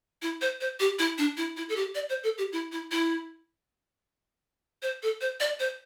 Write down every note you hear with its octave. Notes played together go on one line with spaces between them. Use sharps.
E4
C5
C5
G4
E4
D4
E4
E4
A4
G4
D5
C5
A4
G4
E4
E4
E4
C5
A4
C5
D5
C5